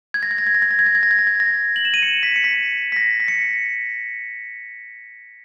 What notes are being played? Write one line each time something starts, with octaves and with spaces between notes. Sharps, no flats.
G#6
A#6
G#6
A#6
G#6
A#6
G#6
A#6
G#6
A#6
G#6
A#6
G#6
A#6
G#6
A#6
F#7
E7
D#7
C#7
B6
C#7
B6
B6
A#6
B6
C#7